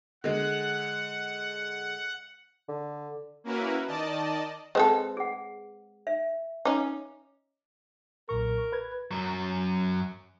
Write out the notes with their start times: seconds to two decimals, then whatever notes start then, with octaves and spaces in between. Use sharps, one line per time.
0.24 D3 G#3 F#5
2.68 D3
3.44 A#3 C#4 E4 F#4 A#4 B4
3.87 D#3 D5 D#5 A5
4.75 G#3 C4 A4 B4 C5 D#5
5.17 G#4 F#5
6.07 E5
6.65 C#4 D#4 D6
8.29 B1 A#2 A#4 C#6
8.72 B4 G#6
9.11 F#2 F#3